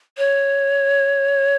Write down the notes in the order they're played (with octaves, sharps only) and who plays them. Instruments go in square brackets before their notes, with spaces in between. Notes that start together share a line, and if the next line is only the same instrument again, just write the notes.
[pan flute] C#5